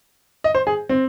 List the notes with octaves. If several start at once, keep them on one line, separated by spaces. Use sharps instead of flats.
D#5
C5
G#4
C4